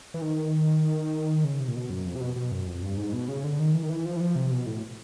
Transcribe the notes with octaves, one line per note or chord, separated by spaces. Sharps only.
E3
D#3
C#3
C3
A#2
B2
F#2
F2
C3
B2
B2
F#2
F2
G2
G#2
B2
C#3
D3
D#3
E3
D#3
E3
F3
E3
F3
C3
B2
A2